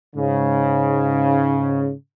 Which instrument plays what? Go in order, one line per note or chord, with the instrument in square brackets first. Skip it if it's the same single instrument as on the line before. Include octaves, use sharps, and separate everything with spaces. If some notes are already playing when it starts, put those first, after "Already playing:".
[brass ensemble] G#2 C#3